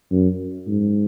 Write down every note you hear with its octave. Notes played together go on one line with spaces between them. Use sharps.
F#2
G#2